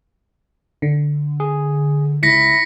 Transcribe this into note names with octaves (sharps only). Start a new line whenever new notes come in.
D3
G#4
C#2 E4 A#6 B6 C#7